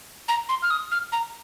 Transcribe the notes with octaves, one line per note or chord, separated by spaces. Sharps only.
A#5
C6
F6
D#6
F6
A#5